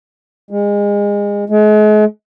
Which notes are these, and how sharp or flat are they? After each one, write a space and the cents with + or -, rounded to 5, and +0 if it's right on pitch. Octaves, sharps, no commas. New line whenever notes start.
G#3 -30
G#3 +40